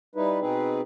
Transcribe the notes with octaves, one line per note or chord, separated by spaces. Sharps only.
G3 D#4 E4 B4
B2 C4 D#4 G#4 B4